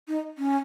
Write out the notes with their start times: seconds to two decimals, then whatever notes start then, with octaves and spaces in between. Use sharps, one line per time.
0.08 D#4
0.38 C#4